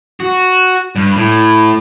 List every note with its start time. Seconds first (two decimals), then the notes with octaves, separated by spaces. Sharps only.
0.20 F#4
0.96 G2
1.16 A2